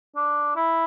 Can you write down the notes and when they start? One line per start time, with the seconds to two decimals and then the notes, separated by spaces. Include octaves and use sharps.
0.16 D4
0.56 E4